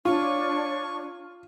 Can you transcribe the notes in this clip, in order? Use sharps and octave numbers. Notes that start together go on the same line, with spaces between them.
D4 F4 C#5 C#6